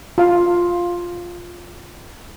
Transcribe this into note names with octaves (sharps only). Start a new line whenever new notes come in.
F4 F5